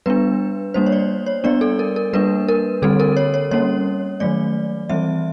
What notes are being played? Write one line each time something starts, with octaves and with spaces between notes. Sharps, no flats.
G3 B3 D4 B4
G3 A#3 D4 C5
C#5
D5
C#5
G3 B3 D4 D5
A4
A#4
A#4
G3 A#3 D4 B4
A#4
D3 G3 C4 A4
A#4
C#5
C#5
G3 A#3 C#4 C#5
D#3 F#3 A3 D5
E3 G3 C4 E5